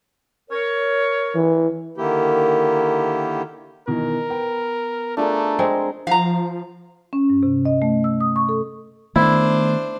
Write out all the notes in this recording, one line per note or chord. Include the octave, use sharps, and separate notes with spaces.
A#4 C#5
E3
D3 D#3 A#3 E4 G4
B2 D#3 E3 A#4
B3 G5
A3 D4 F4 G#4 A#4
G#3 C4
F3 F5 A#5
C#4
G2
C3
D#5
A3
E6
D#6
C#6
A4
D#3 A3 B3 D4 E4 C5